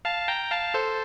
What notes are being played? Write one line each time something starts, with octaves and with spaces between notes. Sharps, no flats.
F5 A5
G5 A#5
F5 A5
A4 C5